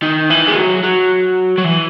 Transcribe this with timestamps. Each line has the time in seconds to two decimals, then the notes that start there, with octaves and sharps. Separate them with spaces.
0.03 D#3
0.30 E3
0.47 G#3
0.56 F#3
0.83 F#3
1.58 F#3
1.64 E3